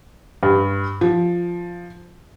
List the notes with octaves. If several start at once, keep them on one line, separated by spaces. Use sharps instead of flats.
G2
F3